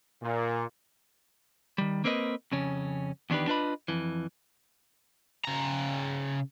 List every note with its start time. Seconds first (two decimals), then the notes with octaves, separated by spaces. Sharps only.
0.22 A#2
1.78 D#3 G3
2.04 A#3 C4 A#4 B4 D#5
2.52 F2 C#3 C#4
3.30 E2 D#3 D4 G4 B4
3.48 D4 F4 B4 D#5 B5
3.88 F2 E3
5.45 C#3 A#5